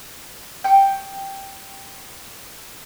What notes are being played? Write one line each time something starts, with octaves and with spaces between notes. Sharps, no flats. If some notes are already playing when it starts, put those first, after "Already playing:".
G5 C#6